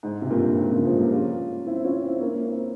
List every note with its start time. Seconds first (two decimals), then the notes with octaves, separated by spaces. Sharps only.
0.03 G#2
0.22 C3
0.30 G2 A#2
0.58 G#2 C3
0.71 A#2 C#3
0.84 F3 G#3
0.98 G3 A#3
1.12 C#4 F4
1.67 C4 E4
1.84 C#4 F4
2.03 C4 E4
2.21 A#3 C#4
2.34 A#3 C#4
2.48 C4 E4